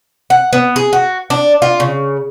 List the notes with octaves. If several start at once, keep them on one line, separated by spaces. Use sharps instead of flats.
F#5
B3
G#4
F#4
D4
F4
C#3